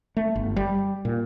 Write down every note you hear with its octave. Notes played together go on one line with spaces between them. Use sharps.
A3
G1
G3
A#2